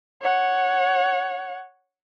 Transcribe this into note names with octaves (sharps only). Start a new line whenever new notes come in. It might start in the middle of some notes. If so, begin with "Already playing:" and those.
C#5 F#5